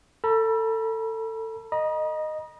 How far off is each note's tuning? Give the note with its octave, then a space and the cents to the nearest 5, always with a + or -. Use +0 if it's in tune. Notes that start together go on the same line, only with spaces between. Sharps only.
A4 +25 B5 -40
D#5 -10 A#5 +45